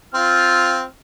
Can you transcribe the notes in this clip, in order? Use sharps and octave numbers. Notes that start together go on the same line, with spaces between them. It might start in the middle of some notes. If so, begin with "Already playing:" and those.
C4 F4 F6